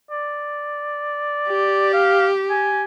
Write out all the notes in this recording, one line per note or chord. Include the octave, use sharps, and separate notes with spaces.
D5
G4
F5
G#5